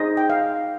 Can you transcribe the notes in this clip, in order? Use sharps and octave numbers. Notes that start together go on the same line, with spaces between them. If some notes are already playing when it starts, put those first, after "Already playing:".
Already playing: D#4 G#4 C5 D#5
G5
F5